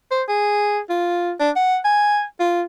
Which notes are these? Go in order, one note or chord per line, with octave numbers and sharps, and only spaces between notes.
C5
G#4
F4
D4
F#5
G#5
F4